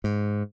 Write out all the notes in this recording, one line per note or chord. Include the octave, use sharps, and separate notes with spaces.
G#2